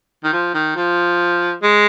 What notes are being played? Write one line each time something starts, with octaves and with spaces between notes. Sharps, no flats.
D#3
F3
D#3
F3
G#3